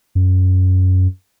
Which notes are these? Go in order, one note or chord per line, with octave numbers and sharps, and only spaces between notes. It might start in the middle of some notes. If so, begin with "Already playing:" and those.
F#2